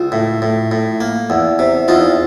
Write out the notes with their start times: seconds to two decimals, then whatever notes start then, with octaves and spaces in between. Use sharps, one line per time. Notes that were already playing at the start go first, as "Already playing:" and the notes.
Already playing: C#2 F4
0.12 A2
0.42 A2
0.71 A2
1.00 A#3
1.30 E2
1.59 C3
1.88 E2 D#4 F4